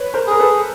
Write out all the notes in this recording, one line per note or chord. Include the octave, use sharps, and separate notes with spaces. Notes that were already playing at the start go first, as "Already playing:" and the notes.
Already playing: B4 C#5
A#4 C5
G#4 A#4
A4 B4